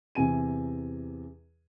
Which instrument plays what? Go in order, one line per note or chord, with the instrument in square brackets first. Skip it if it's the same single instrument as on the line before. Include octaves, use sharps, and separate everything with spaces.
[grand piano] E2 C3 G#5 D#7